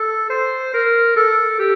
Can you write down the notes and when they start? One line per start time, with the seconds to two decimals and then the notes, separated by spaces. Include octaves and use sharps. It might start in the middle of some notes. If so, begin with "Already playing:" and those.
Already playing: A4
0.30 C5
0.74 A#4
1.16 A4
1.59 G4